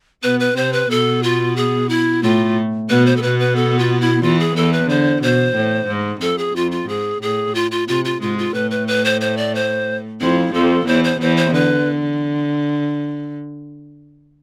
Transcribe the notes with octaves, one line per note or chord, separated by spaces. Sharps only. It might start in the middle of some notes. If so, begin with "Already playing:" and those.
B2 B3 B4
B4
C3 C4 C5
B4
B2 B3 A4
F4
G#4
E4
A2 A3 F4
B2 B3 B4
C5
A4
B2 B3 B4
B4
A4
F4
E4
E2 E3 F4
G#4
E2 E3 A4
B4
D3 C5
B2 C5
A2
G#2
F2 A4
G#4
F2 F4
F4
G#2 G#4
A2 G#4
F4
F4
C3 F4
F4
G#2 G#3 F4
F4
A2 A3 B4
B4
B4
C5
C5
D5
C5
F2 F3 E4
F2 F3 A4
E2 E3 C5
C5
E2 E3 C5
C5
D3 B4